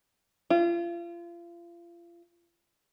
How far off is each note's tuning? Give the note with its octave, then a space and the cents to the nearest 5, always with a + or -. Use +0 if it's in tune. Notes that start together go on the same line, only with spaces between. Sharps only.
F4 -35